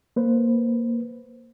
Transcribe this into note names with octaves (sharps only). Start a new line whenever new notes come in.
A#3 B4 C5